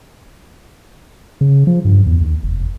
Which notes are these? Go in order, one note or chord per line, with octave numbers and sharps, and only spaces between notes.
C#3
F3
G2
E2
D#2
F1